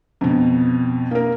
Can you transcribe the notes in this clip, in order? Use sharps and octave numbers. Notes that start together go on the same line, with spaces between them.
F2 B2
A#3 A#4